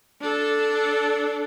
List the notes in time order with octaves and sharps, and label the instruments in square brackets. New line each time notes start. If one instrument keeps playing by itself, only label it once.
[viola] D4 A4